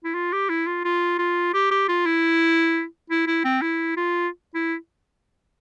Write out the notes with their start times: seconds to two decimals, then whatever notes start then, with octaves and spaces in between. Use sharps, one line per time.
0.04 E4
0.15 F4
0.32 G4
0.49 E4
0.67 F4
0.85 F4
1.19 F4
1.54 G4
1.71 G4
1.89 F4
2.06 E4
3.10 E4
3.27 E4
3.45 C4
3.62 E4
3.97 F4
4.55 E4